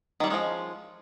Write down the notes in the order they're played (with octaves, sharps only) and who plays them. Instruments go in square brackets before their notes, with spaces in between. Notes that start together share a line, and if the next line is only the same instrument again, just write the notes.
[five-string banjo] D#3
G3
C#4
G#3
F3